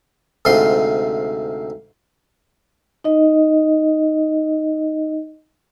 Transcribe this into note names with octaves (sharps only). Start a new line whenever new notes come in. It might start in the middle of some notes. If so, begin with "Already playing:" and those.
D2 G#2 C3 F4 C6
D#4 D#5